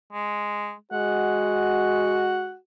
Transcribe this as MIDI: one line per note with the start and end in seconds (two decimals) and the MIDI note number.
0.13 0.74 56
0.92 2.54 56
0.92 2.57 66
0.92 2.55 78